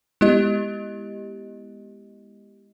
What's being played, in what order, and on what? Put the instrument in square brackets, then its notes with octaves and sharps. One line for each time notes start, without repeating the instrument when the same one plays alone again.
[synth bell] G#3 B3 E4 G4 D#5